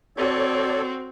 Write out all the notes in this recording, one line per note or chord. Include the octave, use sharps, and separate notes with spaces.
C4 F#4 A4 C#5 D5